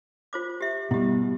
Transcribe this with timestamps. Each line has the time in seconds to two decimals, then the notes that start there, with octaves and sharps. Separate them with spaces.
0.33 F4 C5 D6
0.61 G4 E5
0.91 B2 G3 E4 G4